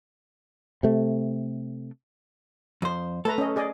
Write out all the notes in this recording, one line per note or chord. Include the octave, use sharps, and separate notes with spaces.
C3 A3
F2 C5
A3 A4 B4 A#5
C#4 D#5
G#4 D5 D#5